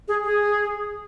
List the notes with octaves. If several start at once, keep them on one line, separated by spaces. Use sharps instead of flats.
G#4
G#4